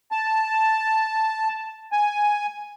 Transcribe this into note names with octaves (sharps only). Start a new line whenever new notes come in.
A5
G#5